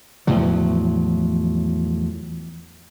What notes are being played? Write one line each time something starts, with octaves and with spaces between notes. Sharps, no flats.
E2 A2 F3 F#3